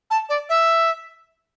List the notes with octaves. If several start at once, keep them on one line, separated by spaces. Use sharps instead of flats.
A5
D5
E5